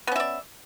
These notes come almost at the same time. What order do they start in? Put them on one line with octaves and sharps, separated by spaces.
B3 C#4 E5 D5